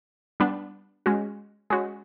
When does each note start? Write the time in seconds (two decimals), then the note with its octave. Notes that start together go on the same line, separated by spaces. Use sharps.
0.40 G3 B3 D4
1.06 G#3 C#4 F#4
1.70 G#3 C#4 F#4